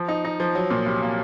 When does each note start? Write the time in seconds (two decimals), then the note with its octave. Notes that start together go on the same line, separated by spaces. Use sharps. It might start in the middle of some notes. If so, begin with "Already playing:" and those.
Already playing: F3
0.08 D#4
0.25 D#4
0.40 F3
0.55 F#3
0.70 A#2
0.86 C2
1.02 A#3